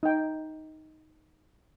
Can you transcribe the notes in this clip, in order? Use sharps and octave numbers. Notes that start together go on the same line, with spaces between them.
D#4 G5